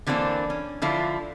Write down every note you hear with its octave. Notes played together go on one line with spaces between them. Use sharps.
D3 E3 A#3 C4 D4
C#4
D3 F3 E4 F4